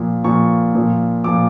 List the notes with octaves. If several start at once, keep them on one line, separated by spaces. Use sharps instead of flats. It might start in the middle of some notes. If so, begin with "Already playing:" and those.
Already playing: A#2 F3
A#2 F3 C#6
A#2 F3
A#2 F3 D6